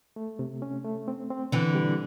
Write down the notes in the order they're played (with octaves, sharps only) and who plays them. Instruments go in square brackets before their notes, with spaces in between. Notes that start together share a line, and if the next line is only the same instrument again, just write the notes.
[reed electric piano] A3
C3
C#4
A3
C4
C4
[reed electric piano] B2 [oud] D3 E3
[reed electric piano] G3